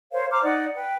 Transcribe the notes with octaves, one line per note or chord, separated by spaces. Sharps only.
A#4 C5 C#5 F5
C5 A#5 D6 F6
D#4 D5 F#5
B4 G5